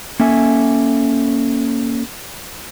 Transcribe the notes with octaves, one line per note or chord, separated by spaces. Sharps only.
A#3 C#4 A4 E5 G#5